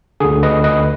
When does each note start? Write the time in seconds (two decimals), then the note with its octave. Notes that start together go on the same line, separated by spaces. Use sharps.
0.20 D2 D3 G#4
0.43 B4 D#5
0.64 B4 D#5